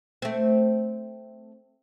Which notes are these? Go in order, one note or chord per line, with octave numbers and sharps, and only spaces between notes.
A3 C4